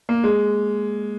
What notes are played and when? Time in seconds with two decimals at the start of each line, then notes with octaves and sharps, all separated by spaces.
0.09 A#3
0.24 G#3